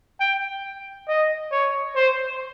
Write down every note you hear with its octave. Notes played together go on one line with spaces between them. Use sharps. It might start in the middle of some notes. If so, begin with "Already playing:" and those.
G5
D#5
C#5
C5